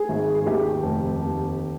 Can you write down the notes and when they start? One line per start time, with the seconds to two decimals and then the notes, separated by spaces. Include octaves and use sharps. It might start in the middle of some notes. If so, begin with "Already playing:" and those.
Already playing: G#4
0.09 G#1
0.35 G#4
0.45 D#2 G4
0.82 F1
1.20 D#2